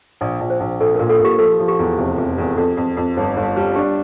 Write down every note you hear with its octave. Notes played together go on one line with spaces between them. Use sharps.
A#1 D5
A#1
C5
A#1
A#1 A4
A#2 A#4
A4
A#2
G4
F3 A4
F3
G4
E2
F1 G4
F1
E2
G4
F2 A4
F2
F2
G1
G1
G3
D4 G4